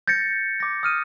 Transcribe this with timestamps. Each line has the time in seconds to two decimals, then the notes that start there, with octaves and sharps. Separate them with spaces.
0.07 G6 A6 A#6 C#7
0.60 D6 A#6
0.83 D#6 F6 D#7